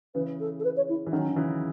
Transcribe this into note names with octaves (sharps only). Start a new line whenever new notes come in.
C#3 E3 B4
A4
A4
B4
C#5
E4
E3
D#3 F#3 C#4
D#3
C#3 E3